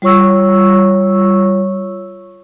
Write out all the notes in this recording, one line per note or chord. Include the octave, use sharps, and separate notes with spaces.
G3 F4 C#5 C#6 E6